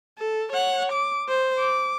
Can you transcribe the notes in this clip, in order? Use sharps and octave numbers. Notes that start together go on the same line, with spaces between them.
A4
C#5 F#5
D6
C5
D6